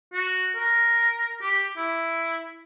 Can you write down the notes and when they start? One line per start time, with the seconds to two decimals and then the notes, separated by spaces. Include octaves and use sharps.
0.13 F#4
0.56 A#4
1.42 G4
1.77 E4